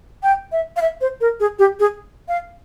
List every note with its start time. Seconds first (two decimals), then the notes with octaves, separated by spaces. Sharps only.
0.23 G5
0.52 E5
0.76 F5
0.82 E5
1.01 C5
1.21 A#4
1.40 G#4
1.59 G4
1.80 G#4
2.28 F5